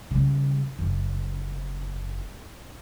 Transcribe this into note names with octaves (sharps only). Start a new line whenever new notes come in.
C#3 G3
F#1